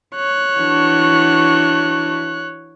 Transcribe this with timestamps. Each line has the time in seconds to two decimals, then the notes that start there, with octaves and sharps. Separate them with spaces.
0.16 C#5 F#6
0.58 E3 D4 F#4